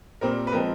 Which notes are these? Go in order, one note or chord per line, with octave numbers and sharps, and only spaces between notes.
A#2 G3 C4 A#4
B4
F3 G#3 C4 A#4